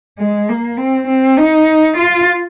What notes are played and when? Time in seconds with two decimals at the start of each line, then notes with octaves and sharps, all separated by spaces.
0.18 G#3
0.49 A#3
0.78 C4
1.08 C4
1.38 D#4
1.98 F4